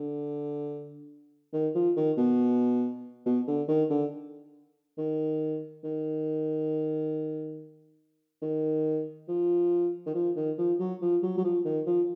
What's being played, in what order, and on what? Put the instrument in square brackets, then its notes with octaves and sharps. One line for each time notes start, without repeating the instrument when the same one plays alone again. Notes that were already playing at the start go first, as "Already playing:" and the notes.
Already playing: [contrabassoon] D3
D#3
F3
D#3
B2
B2
D3
D#3
D3
D#3
D#3
D#3
F3
D#3
F3
D#3
F3
F#3
F3
F#3
F#3
F3
D#3
F3